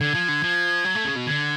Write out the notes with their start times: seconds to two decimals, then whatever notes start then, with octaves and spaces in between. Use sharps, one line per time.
0.01 D3 G#6
0.15 F3
0.28 D3
0.43 F3
0.85 F#3
0.96 A3
1.06 C#3
1.17 B2
1.27 D3 G#6